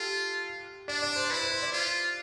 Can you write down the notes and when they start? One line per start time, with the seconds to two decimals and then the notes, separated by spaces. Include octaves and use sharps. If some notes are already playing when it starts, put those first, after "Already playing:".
Already playing: F4 G4 A4
0.88 D4 D5
1.02 D5
1.16 C5
1.30 E4 B4
1.42 B4
1.52 C5
1.62 D5
1.73 F4